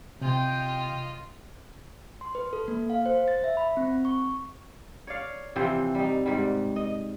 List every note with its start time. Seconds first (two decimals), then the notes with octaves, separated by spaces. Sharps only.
0.21 C3 F4 D#5 G5
2.21 C6
2.35 B4
2.53 A4
2.68 A#3
2.90 F5
3.06 C5
3.28 A6
3.44 E5
3.57 B5
3.77 C4
4.05 C#6
5.07 C#5 D5 F5
5.56 C3 E3 F3 C4
5.95 G3 D#4
6.26 G#2 G3
6.76 D#5